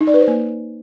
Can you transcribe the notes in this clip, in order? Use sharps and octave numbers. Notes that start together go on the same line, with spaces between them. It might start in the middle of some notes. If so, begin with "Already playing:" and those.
D#4
D5
B4
C5
A#3